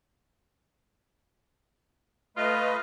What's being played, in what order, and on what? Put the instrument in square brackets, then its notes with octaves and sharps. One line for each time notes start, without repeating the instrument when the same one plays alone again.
[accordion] A3 B4 D#5 [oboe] F4